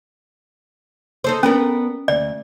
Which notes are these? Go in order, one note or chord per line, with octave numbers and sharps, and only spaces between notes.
D#4 A4 C5
B3 C#4 D4 A#4
D2 D5